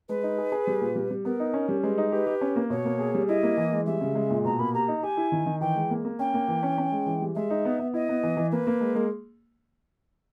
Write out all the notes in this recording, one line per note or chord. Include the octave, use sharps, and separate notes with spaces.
G#3 B4
D#4
G#4
G#4
G3
A#2
G3
G3
B3 A#4
D#4
C#4
G3
G#3 B4
D#4
G4 B4
G4
C#4
A#3
B2 C#5
A#3
G#4
G3
E4 D#5
A#3
E3
G#3
G3 E5
C#3
G#3
A#2
B2 A#5
A#3 B5
G4 A#5
D#4
G4 G#5
E4
D#3
D#3
E3 G5
G#3
A#3
A#3
C#4 G5
A#3
E3
C#4
C#4
G#3
E3
G3
G#3 E5
D#4
B3
B3
E4 D#5
B3
E3
E3
A#3 B4
A#3
G#3
G#3 A#4